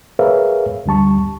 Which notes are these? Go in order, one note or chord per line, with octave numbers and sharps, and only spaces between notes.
G#4 A#4 B4 C#5 E5 F5
D2 D3 G3 A5 C#6